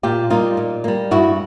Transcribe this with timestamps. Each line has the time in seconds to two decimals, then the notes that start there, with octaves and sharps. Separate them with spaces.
0.03 A#2 F4 G4
0.30 G3 A#3 D#4 F4
0.57 A#2
0.84 G3 A#3
1.11 G2 E4 F#4